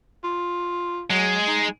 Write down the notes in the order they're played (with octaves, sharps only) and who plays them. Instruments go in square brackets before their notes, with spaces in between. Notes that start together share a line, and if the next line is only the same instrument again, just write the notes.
[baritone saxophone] F4
[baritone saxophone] F#3 [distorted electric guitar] G#3
[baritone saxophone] D#4